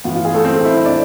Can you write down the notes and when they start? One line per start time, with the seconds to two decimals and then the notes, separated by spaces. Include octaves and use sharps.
0.04 A2 E3 B3 F4
0.15 F4
0.25 G#4
0.34 A3 A4
0.45 C4 C5
0.65 E4 E5
0.85 D4 D5